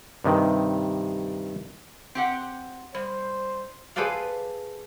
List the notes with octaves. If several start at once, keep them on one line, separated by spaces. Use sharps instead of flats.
G2 C3 D#3
C4 G4 F#5
G3 C5
G#4 A4 B4 C5 D5 F5